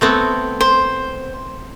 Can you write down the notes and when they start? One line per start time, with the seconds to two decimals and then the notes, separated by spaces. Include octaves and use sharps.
0.01 A3 B3 C4
0.61 C5